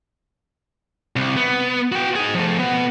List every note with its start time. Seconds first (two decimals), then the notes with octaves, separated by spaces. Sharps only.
1.16 C2
1.37 B3
1.92 F#4 G5
2.16 D#4 G#4
2.35 F3 A3
2.59 B2 B3